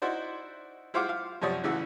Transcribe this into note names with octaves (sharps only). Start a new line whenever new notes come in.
D#4 E4 F#4 C5 D5
E4 F4 C5 F5 F#5 D6
F5
F#2 C3 F3 C#5 D5 D#6
A1 C#3 E3 F#4 E6